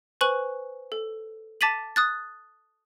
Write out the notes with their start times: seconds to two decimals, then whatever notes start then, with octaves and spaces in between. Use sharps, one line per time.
0.21 B4 C5 G#5 C#6 F#6 F#7
0.92 A4
1.61 A5 D6 A6 B6 D#7 F#7
1.96 D#6 F#6 A6